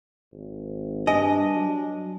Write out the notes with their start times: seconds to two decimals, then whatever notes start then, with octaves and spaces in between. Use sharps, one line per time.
0.32 G#1
1.07 G2 D4 D#5 G#5
1.56 F#3